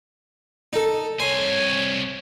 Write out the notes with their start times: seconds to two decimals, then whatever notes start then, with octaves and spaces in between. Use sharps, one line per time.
0.73 D#4 A4
1.20 C2 C5 C#5 G#5